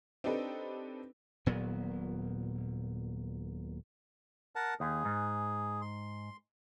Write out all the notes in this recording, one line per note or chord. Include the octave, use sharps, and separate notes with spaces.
C4 D4 D#4 G4 A4 B4
D#1 A#2 F#3 B3
A#4 F#5 A5
D#2 G#4
G#2
C6